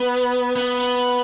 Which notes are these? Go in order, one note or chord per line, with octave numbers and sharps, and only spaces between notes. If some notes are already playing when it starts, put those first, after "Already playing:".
Already playing: B3
B3